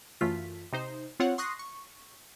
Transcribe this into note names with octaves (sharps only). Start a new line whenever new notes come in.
F#2 E3 A3 F4 B6
C3 D#4 C5
C4 F4 C#5 F#5
C6 C#6 D#6 F#6 A#6 C7
C#6